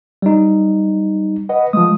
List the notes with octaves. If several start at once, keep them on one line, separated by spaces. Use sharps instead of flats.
G3 D#4
B4 D#5 F#5
F3 G#3 D#6